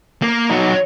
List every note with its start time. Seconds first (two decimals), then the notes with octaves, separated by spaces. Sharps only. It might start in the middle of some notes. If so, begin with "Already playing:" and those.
0.22 A#3
0.49 F#3 D#4